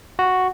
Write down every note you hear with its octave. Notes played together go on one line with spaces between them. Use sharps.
F#4